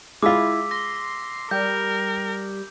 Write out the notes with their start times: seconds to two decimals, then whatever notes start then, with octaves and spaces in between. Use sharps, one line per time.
0.22 G#3 E4 F4 D6 E6 B6
0.71 C6 A#6
1.51 G3 A#4 G6